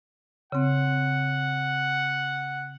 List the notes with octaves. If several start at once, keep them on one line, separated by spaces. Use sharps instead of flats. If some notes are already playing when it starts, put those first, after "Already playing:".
C#3 C4 F#5